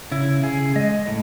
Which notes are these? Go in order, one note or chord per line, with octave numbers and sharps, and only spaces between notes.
C#3 E4
C#3 G#4
G#3 D#5
A2